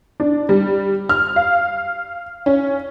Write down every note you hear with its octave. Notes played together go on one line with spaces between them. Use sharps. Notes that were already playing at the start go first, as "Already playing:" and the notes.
D4
G3
F6
F5
C#4